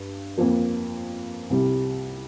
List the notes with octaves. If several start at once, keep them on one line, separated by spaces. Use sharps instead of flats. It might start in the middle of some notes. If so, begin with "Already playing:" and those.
Already playing: G2
F2 F3 A#3
C2 C3 G3